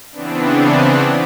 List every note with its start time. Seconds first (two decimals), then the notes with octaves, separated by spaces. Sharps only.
0.12 C#3 E3 B3 C4 D4